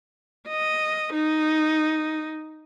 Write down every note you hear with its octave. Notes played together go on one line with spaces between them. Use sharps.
D#5
D#4